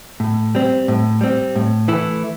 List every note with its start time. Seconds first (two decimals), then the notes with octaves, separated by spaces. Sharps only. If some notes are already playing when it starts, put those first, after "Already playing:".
0.20 A2
0.55 G3 C4
0.88 A2
1.21 G3 C4
1.56 A2
1.88 E3 A3 E4